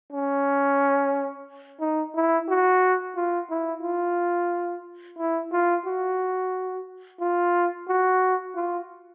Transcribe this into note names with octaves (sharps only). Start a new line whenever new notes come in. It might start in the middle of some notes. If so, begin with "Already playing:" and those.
C#4
D#4
E4
F#4
F4
E4
F4
E4
F4
F#4
F4
F#4
F4